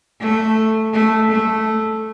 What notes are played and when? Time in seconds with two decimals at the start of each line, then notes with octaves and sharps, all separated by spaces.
0.21 A3
0.93 A3
1.31 A3